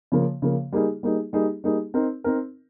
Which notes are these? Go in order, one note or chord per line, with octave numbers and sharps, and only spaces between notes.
C#3 F3 A#3
C#3 F3 A#3
G3 A#3 D#4 G#4
G3 A#3 D#4 G#4
G3 A#3 D#4 G#4
G3 A#3 D#4 G#4
C4 D#4 A#4
C4 D#4 A#4